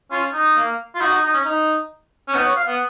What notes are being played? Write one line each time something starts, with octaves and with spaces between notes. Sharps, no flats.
C#4 F4
D#4
A#3
F4
D#4 F#4
D#4
D#4
C#4
D#4
C#4
B3 D#4
C#5
F5
B3